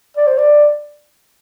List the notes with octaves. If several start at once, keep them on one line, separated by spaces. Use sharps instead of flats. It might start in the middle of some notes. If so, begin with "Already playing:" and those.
D5
C5
D5